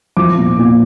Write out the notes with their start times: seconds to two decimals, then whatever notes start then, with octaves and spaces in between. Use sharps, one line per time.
0.17 F3 D6
0.37 A#2
0.58 A#2